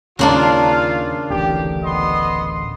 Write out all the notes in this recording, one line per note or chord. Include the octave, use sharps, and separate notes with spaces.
D#2 C#3 A#3 D4 F4
D1 A1 G4
B3 D#5 C6